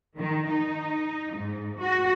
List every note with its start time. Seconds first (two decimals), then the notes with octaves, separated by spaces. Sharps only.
0.18 D#3
0.51 D#4
1.35 G#2
1.80 F#4